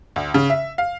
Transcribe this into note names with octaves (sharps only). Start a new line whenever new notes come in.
D2
C#3
E5
F5